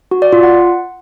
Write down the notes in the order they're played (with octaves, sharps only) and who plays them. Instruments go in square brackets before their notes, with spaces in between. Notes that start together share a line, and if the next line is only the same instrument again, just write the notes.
[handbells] F#4
D5
F4
F#5